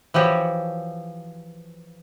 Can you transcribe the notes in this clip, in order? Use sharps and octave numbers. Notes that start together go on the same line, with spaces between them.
E3 F3 F#4 G4 C#5